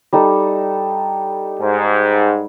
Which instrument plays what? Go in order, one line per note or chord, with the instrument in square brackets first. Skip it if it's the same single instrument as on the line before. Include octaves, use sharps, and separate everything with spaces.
[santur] G3 D#4 A4
[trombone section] G#2